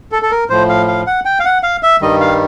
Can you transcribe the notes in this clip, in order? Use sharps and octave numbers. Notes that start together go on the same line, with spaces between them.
A4
A4
A#4
A2 F3 C5
F5
F5
F#5
G5
F5
F#5
F5
E5
G2 D#3 G3 D#5
F5